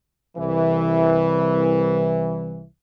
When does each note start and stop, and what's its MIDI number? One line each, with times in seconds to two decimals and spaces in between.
0.37 2.63 36
0.37 2.63 52